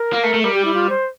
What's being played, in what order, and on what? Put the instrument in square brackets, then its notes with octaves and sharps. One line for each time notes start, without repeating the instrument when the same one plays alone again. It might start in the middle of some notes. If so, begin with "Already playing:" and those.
Already playing: [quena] A#4
[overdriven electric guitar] A#3
A3
A3
[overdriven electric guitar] G3 [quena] A#4
[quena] G4
E4
F4
C5